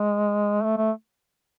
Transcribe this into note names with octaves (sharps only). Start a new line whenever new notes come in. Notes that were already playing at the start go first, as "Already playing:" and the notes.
Already playing: G#3
A3
A3